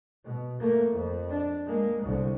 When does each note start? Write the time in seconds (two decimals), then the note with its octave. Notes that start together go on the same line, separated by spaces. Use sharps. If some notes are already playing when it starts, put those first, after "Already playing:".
0.24 B2
0.60 A3 A#3
0.92 F2
1.29 D4
1.66 G#3 A#3
2.03 C2 D3